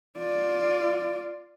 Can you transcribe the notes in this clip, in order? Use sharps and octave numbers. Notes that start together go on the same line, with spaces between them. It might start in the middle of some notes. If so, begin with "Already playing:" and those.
F4 D5